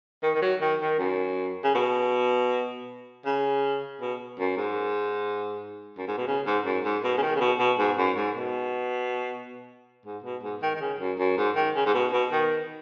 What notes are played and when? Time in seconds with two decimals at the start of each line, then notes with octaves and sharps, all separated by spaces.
0.23 D#3
0.35 D#3
0.42 F#3
0.61 D#3
0.81 D#3
0.99 F#2
1.64 C#3
1.75 B2
3.26 C#3
4.01 B2
4.39 F#2
4.57 G#2
5.98 F#2
6.08 G#2
6.17 B2
6.27 C#3
6.47 G#2
6.66 F#2
6.84 G#2
7.04 B2
7.18 C#3
7.22 D#3
7.36 C#3
7.40 B2
7.59 B2
7.79 G#2
7.98 F#2
8.16 G#2
8.35 B2
10.05 G#2
10.24 B2
10.43 G#2
10.62 D#3
10.75 D#3
10.81 C#3
11.00 F#2
11.19 F#2
11.37 G#2
11.56 D#3
11.75 C#3
11.86 G#2
11.94 B2
12.13 B2
12.32 D#3